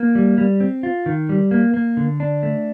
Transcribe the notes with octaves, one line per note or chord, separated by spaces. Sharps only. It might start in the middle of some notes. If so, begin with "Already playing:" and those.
Already playing: A#3
G3
G3
C4
F4
D#3
G3
A#3
A#3
D3
D4
A3